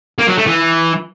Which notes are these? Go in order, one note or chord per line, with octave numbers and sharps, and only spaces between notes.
A#3
F#3
A3
E3